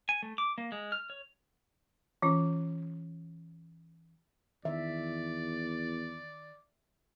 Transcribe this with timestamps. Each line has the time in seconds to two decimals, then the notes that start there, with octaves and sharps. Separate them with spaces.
0.09 G#5
0.22 A3
0.38 D6
0.58 A#3
0.72 G#3
0.92 F6
1.10 C#5
2.22 E3 C#4 F4
4.65 E2 D#3 D5 E5